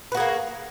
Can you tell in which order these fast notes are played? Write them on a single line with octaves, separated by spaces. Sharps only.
B4 F#4 G#4 A#3